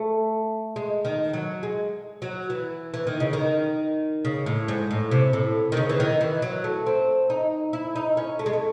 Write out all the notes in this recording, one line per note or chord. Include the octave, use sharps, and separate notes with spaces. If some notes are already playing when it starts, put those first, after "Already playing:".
Already playing: A3
G#3
D#3
F#3
G#3
F#3
E3
E3
D#3
C#3
D#3
C#3
A2
G#2
A2
C3
A2
D#3
C#3
E3
D#3
E3
F#3
A3
C4
D#4
E4
D#4
C#4
A3
G#3
A3